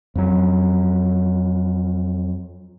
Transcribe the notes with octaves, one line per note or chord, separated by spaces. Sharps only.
F2 F#3